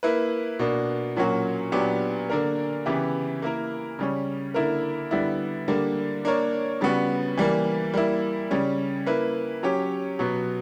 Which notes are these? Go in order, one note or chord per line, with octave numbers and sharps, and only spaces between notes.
A#3 E4 B4
B2 A#3 D4
A#2 F#3 A#3 C#4 F#4
A#2 F#3 B3 D4 G4
D3 A#3 D4 A#4
C#3 E3 B3 E4 G4
A#3 E4 A#4
C#3 G3 C#4
D3 A#3 E4 A#4
D3 G3 B3 E4
D3 G3 A#3 D4
A#3 D4 A#4 C#5
C#3 G3 B3 F#4
E3 G3 A#3
G3 A#3 E4
C#3 G3 C#4
A#3 E4 B4
F#3 C#4 G4 C#5
B2 F#3 B3